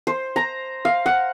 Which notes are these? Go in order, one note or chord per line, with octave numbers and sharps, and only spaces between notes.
C5
A#5
F5
F#5